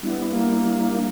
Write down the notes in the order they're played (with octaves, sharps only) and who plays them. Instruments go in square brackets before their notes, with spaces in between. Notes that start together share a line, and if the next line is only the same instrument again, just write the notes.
[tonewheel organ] G3 D4 E4 [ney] B3
[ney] A#3